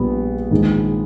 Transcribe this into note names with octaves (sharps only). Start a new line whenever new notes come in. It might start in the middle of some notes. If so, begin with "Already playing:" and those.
Already playing: A#1 A#2 G3 B3
A#1 G#2 D#3 G#3